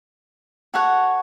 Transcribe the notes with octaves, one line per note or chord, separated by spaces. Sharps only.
F#4 A4 C#5 F#5